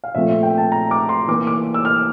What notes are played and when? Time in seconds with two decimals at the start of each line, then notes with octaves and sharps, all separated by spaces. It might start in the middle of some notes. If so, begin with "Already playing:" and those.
0.04 F5
0.15 A#2 F3 A3 C4 E5
0.29 E5
0.43 G5
0.58 A5
0.72 A#5
0.91 D6
1.09 C6
1.28 E3 A#3 D6
1.47 D6
1.74 E6
1.85 F6